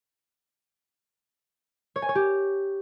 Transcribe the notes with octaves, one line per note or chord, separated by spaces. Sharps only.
C#5
G#5
C#5
G4